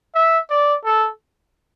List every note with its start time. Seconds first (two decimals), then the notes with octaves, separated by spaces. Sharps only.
0.15 E5
0.50 D5
0.84 A4